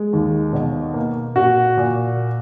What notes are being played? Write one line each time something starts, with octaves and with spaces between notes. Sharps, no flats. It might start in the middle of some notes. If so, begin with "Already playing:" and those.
Already playing: G#3
D#2
B2
A#3
A#2 F#4
A#2